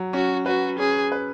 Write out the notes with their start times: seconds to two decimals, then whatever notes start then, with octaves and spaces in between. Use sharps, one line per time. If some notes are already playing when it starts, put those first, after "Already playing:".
Already playing: F#3
0.13 C#4 F#4
0.46 F#4 B4
0.79 C#4 G#4
1.12 B4